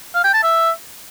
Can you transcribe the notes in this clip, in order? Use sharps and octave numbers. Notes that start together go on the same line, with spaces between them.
F5
G5
A5
E5